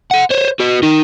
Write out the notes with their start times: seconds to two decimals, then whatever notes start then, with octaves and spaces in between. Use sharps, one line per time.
0.11 F#5 C6
0.30 C5 C#5
0.60 F#4 B4
0.83 D#4 A#4